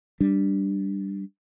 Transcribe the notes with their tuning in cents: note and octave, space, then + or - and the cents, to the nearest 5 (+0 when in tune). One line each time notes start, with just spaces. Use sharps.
G3 +0 D4 +0